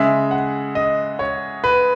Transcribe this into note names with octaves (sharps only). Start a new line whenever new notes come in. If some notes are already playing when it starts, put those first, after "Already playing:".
Already playing: C#3 G#3 E5
F#5
D#5
C#5
B4